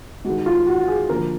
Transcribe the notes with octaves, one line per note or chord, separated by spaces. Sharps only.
D#3 G#3 F#4
F4
F#4
G#4
D3 F3 A#3 A#4